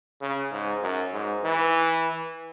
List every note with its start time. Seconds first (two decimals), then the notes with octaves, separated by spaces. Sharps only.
0.21 C#3
0.52 G#2
0.82 F#2
1.14 G#2
1.44 E3